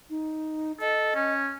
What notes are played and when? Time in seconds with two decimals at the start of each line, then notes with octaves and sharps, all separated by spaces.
0.10 D#4
0.81 A4 D#5
1.15 C#4